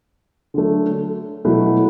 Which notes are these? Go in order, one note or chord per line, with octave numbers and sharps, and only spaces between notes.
D3 F#3 A3
B2 F#3 A3 E4 F#4